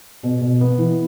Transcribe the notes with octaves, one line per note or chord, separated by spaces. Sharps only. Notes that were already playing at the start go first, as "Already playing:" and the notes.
B2
B2
B3
E3